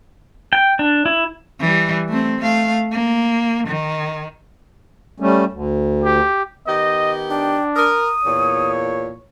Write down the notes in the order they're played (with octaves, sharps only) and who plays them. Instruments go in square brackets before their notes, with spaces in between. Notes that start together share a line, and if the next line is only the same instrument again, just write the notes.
[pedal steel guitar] G5
D4
E4
[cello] E3 G3
A3 C4
A3 F5
A#3
D#3
[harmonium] G3 A3 C#4
D2
[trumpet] G4
[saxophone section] D#3 B3 G4 [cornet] D#5
[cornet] D4 [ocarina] G5
[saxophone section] A#4 [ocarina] D#6
[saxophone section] E2 A#2 [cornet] C#5